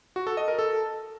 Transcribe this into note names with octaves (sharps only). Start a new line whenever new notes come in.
F#4
A4
D#5
A#4
A4